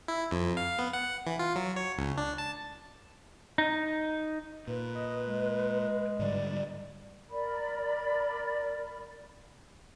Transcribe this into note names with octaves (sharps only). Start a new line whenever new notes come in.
E4
F2
F5
B3
F#5
E3
F4
F#3
C#5
C#2
D4
A5
D#4
A#2 B4
D#5
G#3
G#2 D3 G3 D5
A#4 D5 B5